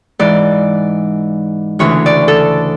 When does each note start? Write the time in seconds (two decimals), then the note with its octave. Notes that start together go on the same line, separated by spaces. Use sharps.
0.19 G#2 E3 D5
1.79 D2 C#3 E3 C#5
2.06 D5
2.28 A4